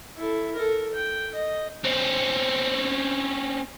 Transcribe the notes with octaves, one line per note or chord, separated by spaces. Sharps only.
E4 A4
A4 A#4
G5
D#5
C4 C#4